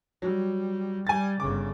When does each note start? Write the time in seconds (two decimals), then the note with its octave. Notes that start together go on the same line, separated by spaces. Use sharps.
0.22 F#3 G3
1.07 G3 G#5 A6
1.40 G1 C#3 D6